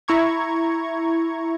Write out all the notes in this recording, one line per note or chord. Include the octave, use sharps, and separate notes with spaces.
E4 A#5 C#6 G#6